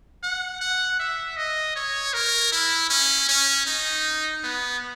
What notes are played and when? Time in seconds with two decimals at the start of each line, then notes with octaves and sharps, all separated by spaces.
0.23 F#5
0.61 F#5
0.99 E5
1.37 D#5
1.76 C#5
2.13 A#4
2.52 E4
2.90 C#4
3.29 C#4
3.66 D#4
4.43 B3